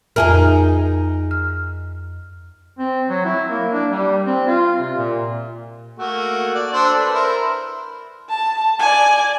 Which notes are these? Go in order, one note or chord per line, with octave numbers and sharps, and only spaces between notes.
F2 D#4 G#4 A#4 E5 F6
F6
C4
F#3
E4
A#3
D4
G3
C4
F4
C3
A#2
A3 A#3 F#4
D5
D4 A4 C5
B4
E4 A#4 C5
A5
D5 G#5